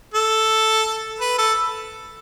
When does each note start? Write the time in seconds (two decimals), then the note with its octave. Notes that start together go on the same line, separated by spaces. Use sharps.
0.14 A4
1.20 B4
1.38 A4